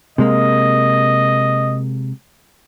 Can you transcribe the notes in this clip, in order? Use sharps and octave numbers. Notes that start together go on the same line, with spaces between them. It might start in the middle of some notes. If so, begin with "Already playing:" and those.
C3 G#3 A#3 D#5